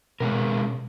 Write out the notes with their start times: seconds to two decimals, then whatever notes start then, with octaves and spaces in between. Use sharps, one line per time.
0.20 B2 G#3 C#4 A#4